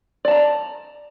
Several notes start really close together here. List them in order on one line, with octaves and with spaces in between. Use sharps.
D5 A5 A#5